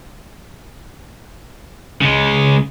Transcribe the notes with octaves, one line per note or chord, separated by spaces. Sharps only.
C#3 G#3